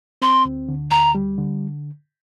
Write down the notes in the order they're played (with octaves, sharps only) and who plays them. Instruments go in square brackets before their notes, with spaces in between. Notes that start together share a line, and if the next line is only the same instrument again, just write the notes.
[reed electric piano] C4 [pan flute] C6
[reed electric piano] D2
D3
[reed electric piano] D2 [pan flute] A#5
[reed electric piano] G3
D3